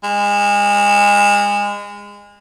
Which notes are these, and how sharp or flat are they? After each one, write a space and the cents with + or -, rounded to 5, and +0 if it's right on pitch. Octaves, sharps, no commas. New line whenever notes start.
G#3 -30